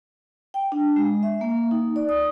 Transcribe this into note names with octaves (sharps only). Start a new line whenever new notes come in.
G5
D4
G#3
E5
A#3
D#4
D5
D#6